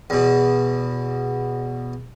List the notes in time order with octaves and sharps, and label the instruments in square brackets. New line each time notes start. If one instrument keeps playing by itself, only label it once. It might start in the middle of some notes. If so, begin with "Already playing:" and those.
[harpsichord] E2 B2